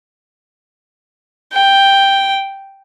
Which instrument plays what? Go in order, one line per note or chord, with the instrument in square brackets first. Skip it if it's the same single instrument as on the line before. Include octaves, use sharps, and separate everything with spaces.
[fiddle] G5